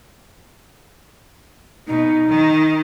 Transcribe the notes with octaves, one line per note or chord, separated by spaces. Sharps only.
B2 D#4
D#3